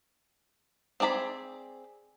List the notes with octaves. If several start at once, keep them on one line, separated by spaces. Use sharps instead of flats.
C4 G#4 D5 A#5 B5